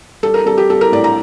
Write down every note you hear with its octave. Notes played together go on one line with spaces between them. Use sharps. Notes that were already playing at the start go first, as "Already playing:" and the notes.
G3 A4
A#4
G3 A4
G4
G3 A4
A#4
A2 D5
A#5